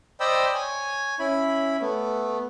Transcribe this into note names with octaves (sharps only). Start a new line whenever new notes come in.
C5 D5 D#5 G5 B5 E6
C#5 G#5
C#4 E4 B5
A3 B3